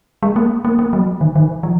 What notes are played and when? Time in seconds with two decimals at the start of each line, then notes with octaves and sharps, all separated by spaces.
0.23 G#3
0.36 A#3
0.65 A#3
0.79 A#3
0.93 F#3
1.21 D#3
1.36 D#3
1.63 F3